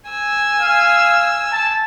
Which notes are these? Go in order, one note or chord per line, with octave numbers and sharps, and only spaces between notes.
G#5 E6
F5
A5